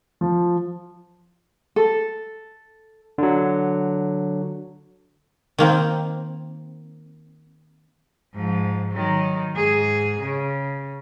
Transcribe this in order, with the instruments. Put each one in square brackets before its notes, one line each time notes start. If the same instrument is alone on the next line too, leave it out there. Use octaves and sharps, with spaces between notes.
[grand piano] F3
[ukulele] A4
[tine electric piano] D3 F#3
[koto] D#3 A#3 C4
[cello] G#2 F3
D#3 F#3
G#2 G#4
C#3